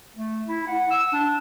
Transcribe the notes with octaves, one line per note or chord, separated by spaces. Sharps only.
A3
E4
F#5
E6
D4